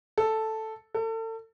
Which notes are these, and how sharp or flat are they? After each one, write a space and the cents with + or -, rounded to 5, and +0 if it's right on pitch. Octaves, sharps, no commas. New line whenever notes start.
A4 +0
A4 +35